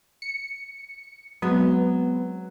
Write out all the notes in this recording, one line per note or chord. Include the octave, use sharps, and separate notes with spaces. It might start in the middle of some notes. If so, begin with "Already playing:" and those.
C#7
F#3 G#3 B3 C4